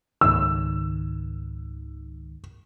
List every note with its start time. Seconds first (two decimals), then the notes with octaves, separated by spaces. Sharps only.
0.21 C#2 G#2 D#3 E6